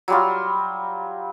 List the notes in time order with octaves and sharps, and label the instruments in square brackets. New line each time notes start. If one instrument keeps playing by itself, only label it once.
[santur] F#3 G3 F4